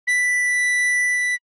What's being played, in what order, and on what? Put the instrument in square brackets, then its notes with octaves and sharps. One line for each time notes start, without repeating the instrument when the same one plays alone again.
[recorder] B6